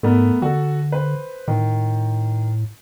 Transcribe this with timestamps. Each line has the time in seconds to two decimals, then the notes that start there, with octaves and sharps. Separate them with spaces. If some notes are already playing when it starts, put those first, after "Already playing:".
0.03 G#2 A3 B3 A#4
0.42 D3 F#4 A4
0.92 B4 C5
1.48 A2 D#3